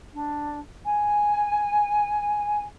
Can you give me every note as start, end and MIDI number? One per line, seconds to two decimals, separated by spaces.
0.13 0.59 62
0.85 2.65 80